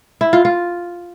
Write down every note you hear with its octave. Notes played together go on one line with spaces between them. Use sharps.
E4
F4
F4